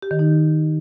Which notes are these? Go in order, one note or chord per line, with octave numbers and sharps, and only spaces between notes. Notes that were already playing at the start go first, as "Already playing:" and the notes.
G4
D#3
D#4